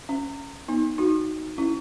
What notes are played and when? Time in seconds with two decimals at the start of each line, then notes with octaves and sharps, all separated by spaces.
0.09 C#4
0.68 B3 D#4
0.98 D#4 F#4
1.58 C#4 E4